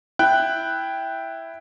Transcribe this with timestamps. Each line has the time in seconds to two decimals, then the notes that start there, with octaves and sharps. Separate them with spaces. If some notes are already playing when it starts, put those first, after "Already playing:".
0.19 E4 G5 F#6